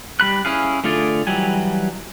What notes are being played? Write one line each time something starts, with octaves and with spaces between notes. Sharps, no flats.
G3 B5 F#6
C#4 E4 G#4 F5
D3 A3 F4 G#4 D5
E3 F#3 G3 G#5